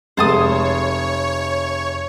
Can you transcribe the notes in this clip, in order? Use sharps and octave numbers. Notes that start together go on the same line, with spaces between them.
F1 G#3 C5 C#5 A5 D#6